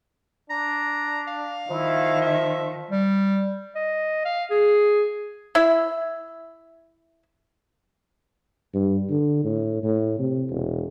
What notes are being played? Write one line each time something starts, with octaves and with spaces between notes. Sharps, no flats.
D4 A#5
F5
D#3 F3 E4
E5
G3
D#5
F5
G#4
E4 E5
G2
D3
A2
A2
C3
E1